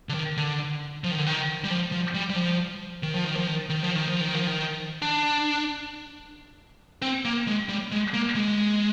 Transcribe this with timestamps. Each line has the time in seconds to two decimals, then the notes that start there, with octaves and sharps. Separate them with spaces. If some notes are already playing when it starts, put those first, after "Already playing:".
0.09 D3
0.14 D#3
0.37 D3
1.04 F3
1.11 D#3
1.18 D3
1.26 D#3
1.64 G3
1.70 F3
1.92 F3
2.14 G3
2.30 G3
2.36 F3
3.03 D#3
3.14 F3
3.24 D#3
3.37 F3
3.47 D#3
3.69 D#3
3.83 F3
3.96 D#3
4.09 F3
4.21 D#3
4.34 F3
4.47 D#3
5.02 D4
7.02 C4
7.25 A#3
7.47 G#3
7.69 G3
7.92 G#3
8.14 A#3
8.35 G#3